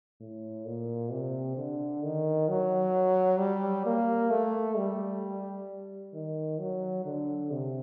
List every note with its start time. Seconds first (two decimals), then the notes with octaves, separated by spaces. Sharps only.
0.20 A2
0.66 A#2
1.11 C3
1.57 D3
2.03 D#3
2.49 F#3
3.39 G3
3.86 A#3
4.30 A3
4.77 G3
6.13 D#3
6.59 F#3
7.05 D3
7.51 C3